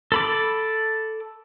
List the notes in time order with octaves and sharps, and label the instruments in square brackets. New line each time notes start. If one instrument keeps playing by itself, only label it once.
[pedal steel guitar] A4 B5 D6